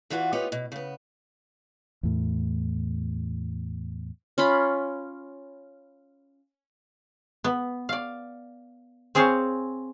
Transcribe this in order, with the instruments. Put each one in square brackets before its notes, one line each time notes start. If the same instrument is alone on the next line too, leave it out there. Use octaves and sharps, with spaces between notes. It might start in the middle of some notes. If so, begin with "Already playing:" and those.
[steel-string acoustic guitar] E2 E3 F4 F#4 F#5
B3 D#4 F4 G4 C#5
B2
C#3 B3
[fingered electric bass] E2 A2
[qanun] C#4 F4 B5
[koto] B3
D5 F5
C4 G#4 C5 C#5 F5